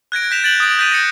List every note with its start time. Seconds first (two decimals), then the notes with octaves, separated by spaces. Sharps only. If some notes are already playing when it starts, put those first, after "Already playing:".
0.12 F#6 G#6 A#6 D7
0.31 G6 B6 E7 F7
0.44 A6 D7 F#7
0.60 D#6 D7
0.79 G6 A6 B6 D#7 F7
0.92 A#6 C#7